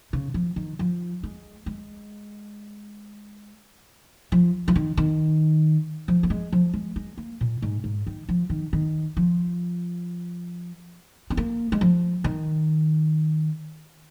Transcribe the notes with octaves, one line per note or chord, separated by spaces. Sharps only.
C#3
F3
D#3
F3
G#3
G#3
F3
F3
D#3
D#3
F3
A#3
G#3
F3
G#3
G#3
A#3
A#2
G#2
G#2
D#3
F3
D#3
D#3
F3
C#4
A#3
G#3
F3
D#3